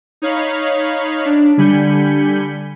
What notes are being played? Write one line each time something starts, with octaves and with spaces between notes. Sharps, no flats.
D#4 C#5 F5 B5
D4
D3 G3 G#5 B5 G6 C#7